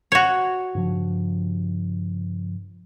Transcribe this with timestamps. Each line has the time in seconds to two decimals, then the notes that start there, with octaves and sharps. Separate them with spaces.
0.12 F#4 C#5
0.75 G2 C#3 F3